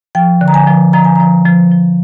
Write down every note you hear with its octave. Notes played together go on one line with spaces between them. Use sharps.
F3 G5
D3
A#5
G#5
F3
F3 A#5
G#5
F3 A#5
F3
F3